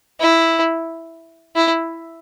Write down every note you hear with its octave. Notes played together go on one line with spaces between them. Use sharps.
E4
E4